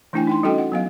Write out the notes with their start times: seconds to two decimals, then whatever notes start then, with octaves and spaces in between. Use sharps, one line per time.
0.13 E3 A3 D4 E4 G5 G#5
0.27 D#4 G5 C6
0.43 G3 C#4 F#4 A4 D#5 G5
0.58 F#5
0.72 F#3 B3 F5